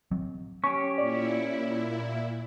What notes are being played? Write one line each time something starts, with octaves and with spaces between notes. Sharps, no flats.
F#3 C4
C#4 G4 C#6
A#2 E4 D5